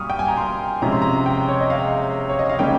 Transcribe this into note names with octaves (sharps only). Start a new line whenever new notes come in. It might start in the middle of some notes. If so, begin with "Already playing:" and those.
Already playing: A#2 G3 A#3 C#6 D#6 F6
G5
G#5
A#5
C6
C3 F3 G#3 C#4 A#5
C6
A#5
G5
C#5
D#5
F5
C#5
D#5
F5
C#3 G3 A#3 C#4 G5